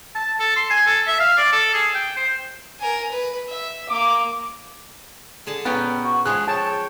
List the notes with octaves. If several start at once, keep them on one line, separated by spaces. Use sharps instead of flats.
A5
A4
C6
G#5
A4
E5
F5
D5
A4
G#4
G5
C5
A#4 G#5
B4
E5
A#3 D6
D3 G#4 A5
A#2 B3 C#4 A#4 G5
F#4
F3 G#3 G#4 F#6
C#5 G5 A5